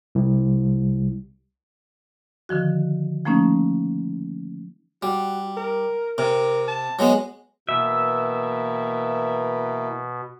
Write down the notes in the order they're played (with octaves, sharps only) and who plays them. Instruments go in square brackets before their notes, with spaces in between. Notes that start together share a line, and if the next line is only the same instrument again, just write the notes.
[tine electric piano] C2
[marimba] D3 D#3 F3 F#4
F3 A3 A#3 C#4 D#4
[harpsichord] G3 [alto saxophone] F#4
[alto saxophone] A#4
[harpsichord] C3 [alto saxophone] A#4
[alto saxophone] A5
[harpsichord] F#3 G#3 B3
[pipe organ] B2 [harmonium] E3 A#3 [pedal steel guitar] E5